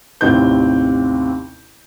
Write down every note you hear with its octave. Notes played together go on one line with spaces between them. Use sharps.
A1 D#2 C3 C4 G6